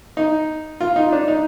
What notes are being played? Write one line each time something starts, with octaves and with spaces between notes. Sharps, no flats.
D#4
F4
D#4
D4
D#4